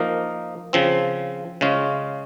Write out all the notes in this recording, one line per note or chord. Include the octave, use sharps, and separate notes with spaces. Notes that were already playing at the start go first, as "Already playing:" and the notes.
Already playing: F3 A#3 D#4 A#4
C#3 F3 C4
C#3 G#3 C#4 F4